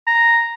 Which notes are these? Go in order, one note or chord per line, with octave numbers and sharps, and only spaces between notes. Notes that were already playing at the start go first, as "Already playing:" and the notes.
A#5